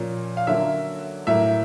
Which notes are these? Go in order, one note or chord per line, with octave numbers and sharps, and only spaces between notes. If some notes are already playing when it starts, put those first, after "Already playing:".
Already playing: A#2 F3 A#3 C#4
F5
D3 F#3 A#3 C#4 E5
A2 F#3 A#3 E5